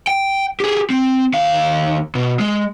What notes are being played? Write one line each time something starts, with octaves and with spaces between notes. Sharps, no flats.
G5
G4 G#4
C4
D#2 F5
B2
G#3